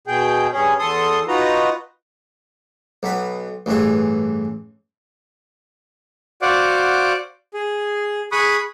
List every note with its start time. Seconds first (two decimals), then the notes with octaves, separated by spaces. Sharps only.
0.07 B2 G#4 G5
0.52 G2 C#4 G#4
0.79 E2 A4 C6 D#6
1.28 D#4 F4 F#4 B4 A#5
3.03 B1 B3 B5
3.66 A1 G2 E3 G#4
6.42 F#4 C5 D5 F5 F#5 D6
7.54 G#4
8.32 G#4 B5 C#6 D#6 F#6